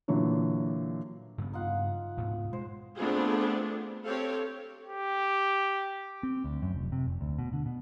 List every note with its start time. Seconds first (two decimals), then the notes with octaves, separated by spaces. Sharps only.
0.08 A#2 D3 E3 F#3
1.38 G2 C#3 B3
1.53 D#4 F4 F#5
2.17 D2 G#2 B2
2.53 G#3 C5
2.97 A3 B3 C4 D4 F4 G#4
4.06 C4 G4 A4 C#5 F5
4.83 G4
6.23 C4
6.44 D2
6.62 F#2
6.74 F1
6.92 C3
7.06 F1
7.21 D2
7.39 B2
7.53 D3
7.66 B2